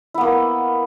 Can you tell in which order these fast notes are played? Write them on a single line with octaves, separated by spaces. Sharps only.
E4 B3 A#3